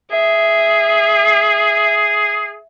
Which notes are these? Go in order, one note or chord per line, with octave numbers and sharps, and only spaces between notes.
G#4 E5